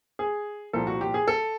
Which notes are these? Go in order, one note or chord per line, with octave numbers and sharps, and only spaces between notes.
G#4
C2 A#2 F3 A4
F#4
G4
G#4
A4